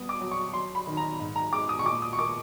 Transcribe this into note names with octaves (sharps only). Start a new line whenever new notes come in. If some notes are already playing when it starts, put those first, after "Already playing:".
Already playing: G3 B3 D#6
D6
F#3
C#6
F#3 C6
B5
D#3
A#5
G#2
A#5
G#3 D6
D#6
C#6
A#2 D6
D#6
C#6
A#3 D6